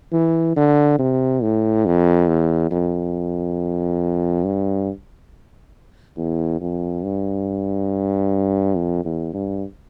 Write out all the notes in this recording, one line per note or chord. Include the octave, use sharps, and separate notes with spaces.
E3
D3
C3
A2
F2
E2
F2
G2
E2
F2
G2
F2
E2
G2